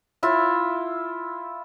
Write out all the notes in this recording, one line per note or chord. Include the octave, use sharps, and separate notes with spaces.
E4 F4 E5